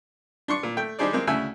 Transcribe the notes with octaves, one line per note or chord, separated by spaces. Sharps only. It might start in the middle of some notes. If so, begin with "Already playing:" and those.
D4 C6 C#6
A#2
A3 G5
G3 D4 D#4 G#4 C5 D5
G#3 A#3 C4
D2 C#3 E4 G#5 E6